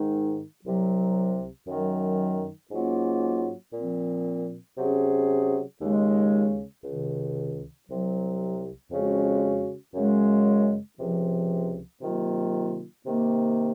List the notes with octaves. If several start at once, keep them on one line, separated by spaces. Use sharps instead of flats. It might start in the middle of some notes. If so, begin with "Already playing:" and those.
Already playing: G#2 D#3 G#3 D#4
C2 C3 F#3
F#2 D#3 F#3
G#2 F#3 A#3 C#4 F4
A#2 F3 C4
C3 F#3 C#4 G#4
D#2 C#3 G#3
C#2 C3 D#3
C2 C3 F#3
F2 C#3 G#3 C#4 F#4
F#2 C#3 G#3
C#2 C3 F3
C3 D#3 F#3 A#3 F4
C3 D#3 A#3